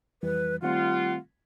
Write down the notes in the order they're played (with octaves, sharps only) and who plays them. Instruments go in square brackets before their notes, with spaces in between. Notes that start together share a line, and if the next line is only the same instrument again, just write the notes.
[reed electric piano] F2 E3 G3 [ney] B4
[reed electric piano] D#3 A3 C4 [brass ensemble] G3 F4 [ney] F#5